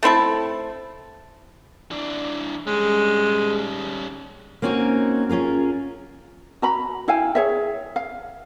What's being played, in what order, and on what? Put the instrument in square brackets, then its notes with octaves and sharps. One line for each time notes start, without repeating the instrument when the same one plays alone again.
[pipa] A3 C4 E4 A4
[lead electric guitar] E3 D4
[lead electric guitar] G3 C#4 [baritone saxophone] G#3
[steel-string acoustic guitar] A#3 C4 C#4 D#4 F#4
C#4 F4 G#4 A#4
[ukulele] F#4 A#5 B5
E4 F5 G5 G#5
G#4 C#5 E5
F5